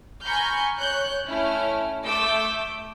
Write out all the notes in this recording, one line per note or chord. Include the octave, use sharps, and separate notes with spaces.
G#5 A#5 B5 C#6 F6 G6
C#5 F#6 G6
A3 C#4 E4 F6
A3 D6 E6 G6